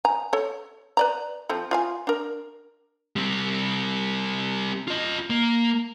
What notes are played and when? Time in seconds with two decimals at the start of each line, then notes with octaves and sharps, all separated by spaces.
0.05 G#5 A#5
0.33 A4 C#5
0.97 B4 D5 A#5
1.49 F3 C4 A4
1.71 F4 F5 G#5
2.07 D4 A#4
3.16 G3 C4
4.88 F4 D#5
5.30 A#3